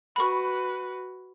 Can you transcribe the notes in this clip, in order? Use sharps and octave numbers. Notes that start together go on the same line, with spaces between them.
F#4 B4 B5 C#6